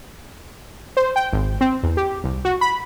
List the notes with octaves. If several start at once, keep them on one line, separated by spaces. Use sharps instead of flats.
C5
G5
G#1
C4
E2
G4
C2
F#4
B5